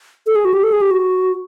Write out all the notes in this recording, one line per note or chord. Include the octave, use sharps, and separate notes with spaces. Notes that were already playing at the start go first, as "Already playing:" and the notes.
A4
G#4
F#4
G4
A4
G#4
G4
F#4